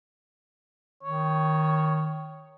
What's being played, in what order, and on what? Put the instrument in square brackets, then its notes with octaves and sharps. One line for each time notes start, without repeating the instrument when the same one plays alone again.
[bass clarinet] D#3 [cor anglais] C#5